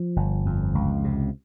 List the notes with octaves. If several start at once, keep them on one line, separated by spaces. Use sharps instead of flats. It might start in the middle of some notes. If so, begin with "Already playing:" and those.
Already playing: F3
G1
F2
C#2
C3